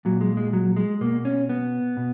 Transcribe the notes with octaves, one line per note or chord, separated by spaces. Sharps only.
A#2 F#3
G#3
G#3
F#3
G#3
B2 A#3
C#4
B3
B2